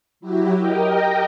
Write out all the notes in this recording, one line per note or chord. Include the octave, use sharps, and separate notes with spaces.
F#3 E4 F#4 G4
G4 A#4 D#5 G5